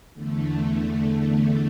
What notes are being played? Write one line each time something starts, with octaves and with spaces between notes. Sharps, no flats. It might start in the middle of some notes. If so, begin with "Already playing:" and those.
E2 D3 A3